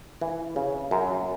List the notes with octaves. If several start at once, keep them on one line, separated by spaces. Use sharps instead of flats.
E3
C#3
F#2